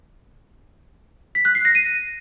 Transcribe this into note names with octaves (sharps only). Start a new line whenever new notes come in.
B6
F#6
C7
A#6
D#7